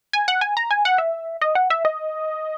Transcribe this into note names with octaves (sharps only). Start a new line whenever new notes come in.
G#5
F#5
G#5
A#5
G#5
F#5
E5
D#5
F#5
E5
D#5